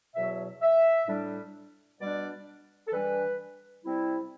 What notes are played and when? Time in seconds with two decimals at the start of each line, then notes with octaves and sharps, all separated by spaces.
0.15 E2 B2 F#3 E5
0.62 E5
1.08 A2 G3 D4
1.99 B2 G3 D4 D5
2.87 A4
2.92 G2 E3 G3 D4 B4
3.84 C3 G3 C4 E4